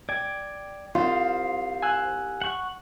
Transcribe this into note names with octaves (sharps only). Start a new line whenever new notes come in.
D5 G5 G#6
C2 F4 C5 F5
G#5 E6 F#6
F#5 C#6